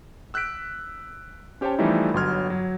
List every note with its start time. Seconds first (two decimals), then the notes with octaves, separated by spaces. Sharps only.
0.34 E6 F#6 G6 B6 D7
1.61 C#4 G4 C5 C#5 G5 A5
1.79 E3 F3 G3 A3 D#4 E4
2.14 G1 F#3 C6 F6 G#6
2.50 F#3